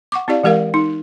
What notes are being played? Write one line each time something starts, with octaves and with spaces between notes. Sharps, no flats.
F#5 C#6 D6
C4 E4 G4 D5 F5
E3 G#3 G4 A#4 F5
D#4